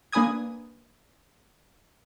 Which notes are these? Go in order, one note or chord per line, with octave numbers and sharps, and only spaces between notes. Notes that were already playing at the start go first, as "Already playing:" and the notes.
A#3 D4 B4 G#5 D#6 G#6